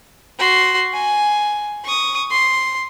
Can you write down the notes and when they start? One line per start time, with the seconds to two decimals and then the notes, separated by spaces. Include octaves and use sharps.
0.39 F#4 C6
0.94 G#5
1.84 C#6 D#6
2.31 C6